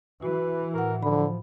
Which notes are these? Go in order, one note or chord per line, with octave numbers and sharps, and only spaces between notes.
E3 F#4 B4
A2 A#4 F#5
D3 F3 B5